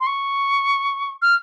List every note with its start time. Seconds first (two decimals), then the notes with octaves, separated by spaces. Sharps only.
0.01 C6
0.07 C#6
1.22 F6